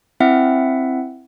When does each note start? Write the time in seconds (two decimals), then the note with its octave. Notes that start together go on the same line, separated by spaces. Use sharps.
0.20 C4 E4 E5 F#5